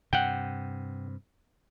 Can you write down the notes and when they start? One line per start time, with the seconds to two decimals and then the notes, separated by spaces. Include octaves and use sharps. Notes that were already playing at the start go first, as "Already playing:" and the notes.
0.13 G2 C3 F#5 G5